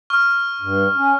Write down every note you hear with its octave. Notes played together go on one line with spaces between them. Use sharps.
C#6 F6
G2
C#4